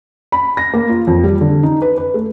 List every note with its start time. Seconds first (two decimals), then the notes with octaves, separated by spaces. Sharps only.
0.32 B5
0.57 A#6
0.74 A#3
0.89 F4
1.07 F2
1.23 G3
1.41 D3
1.63 D#4
1.82 B4
1.98 B4
2.14 A3